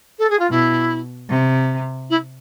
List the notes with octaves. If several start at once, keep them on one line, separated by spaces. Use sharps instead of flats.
A4
G#4
F4
B2 E4
C3
E4